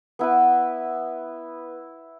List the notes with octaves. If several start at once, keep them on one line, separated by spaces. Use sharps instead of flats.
B3 E4 B4